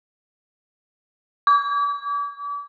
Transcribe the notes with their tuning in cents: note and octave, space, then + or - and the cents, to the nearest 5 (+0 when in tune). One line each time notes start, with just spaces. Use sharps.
D6 -40